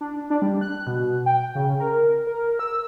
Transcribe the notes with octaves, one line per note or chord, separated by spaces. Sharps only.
D4
D4
G3
F#6
B2
G5
C#3
A#4
A#4
E6